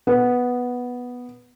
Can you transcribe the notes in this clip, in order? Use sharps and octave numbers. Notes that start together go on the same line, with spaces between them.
B3